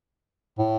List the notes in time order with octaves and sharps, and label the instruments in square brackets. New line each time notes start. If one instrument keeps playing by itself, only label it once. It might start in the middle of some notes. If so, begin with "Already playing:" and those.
[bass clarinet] A2